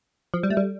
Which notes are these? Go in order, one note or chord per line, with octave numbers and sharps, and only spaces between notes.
F3
G3
A3
G3